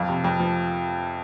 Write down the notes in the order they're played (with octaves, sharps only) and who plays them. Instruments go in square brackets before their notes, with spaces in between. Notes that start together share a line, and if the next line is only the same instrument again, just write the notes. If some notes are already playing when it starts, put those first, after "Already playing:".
Already playing: [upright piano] F2 F5
C3
F2
F3